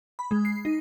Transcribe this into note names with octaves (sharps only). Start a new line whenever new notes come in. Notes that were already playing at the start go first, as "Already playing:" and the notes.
B5
G#3
C7
D#4